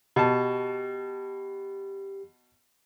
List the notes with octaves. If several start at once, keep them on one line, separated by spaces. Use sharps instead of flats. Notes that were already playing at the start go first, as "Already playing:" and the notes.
B2 G4 A5